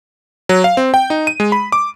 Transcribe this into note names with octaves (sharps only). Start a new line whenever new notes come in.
F#3
F5
C4
G5
D#4
D#7
G#3
B5
D6